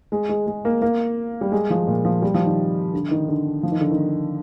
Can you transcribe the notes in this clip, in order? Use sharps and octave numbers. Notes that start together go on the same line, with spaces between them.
G#3
G#3
G#3
A#3
A#3
G3
G#3
F3
A#2
F3
G3
F3
D#3
D3
D#3
D3
F3
D#3
D3
D#3